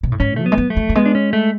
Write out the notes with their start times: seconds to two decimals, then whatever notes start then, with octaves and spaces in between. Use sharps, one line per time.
0.03 B2
0.12 A2
0.20 G#2 C#4
0.36 F#3 A3
0.46 B3
0.52 G#3
0.58 F#3
0.70 A3
0.77 F#3
0.89 F#3
0.95 G#3 B3
1.06 D4
1.15 C#4
1.33 A3